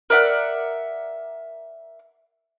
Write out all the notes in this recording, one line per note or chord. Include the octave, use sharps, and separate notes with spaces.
A#4 D5 E5 F#5